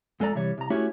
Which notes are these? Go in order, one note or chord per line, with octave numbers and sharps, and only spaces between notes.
F2 G#3 A4 D5 A#5
C3 E3 G3 C#5
C2 A#5
A3 C#4 E4 F#4 G4 C#5